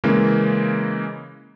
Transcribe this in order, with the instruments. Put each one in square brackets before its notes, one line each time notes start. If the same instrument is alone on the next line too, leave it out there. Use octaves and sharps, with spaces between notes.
[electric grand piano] C#3 E3 G#3 A#3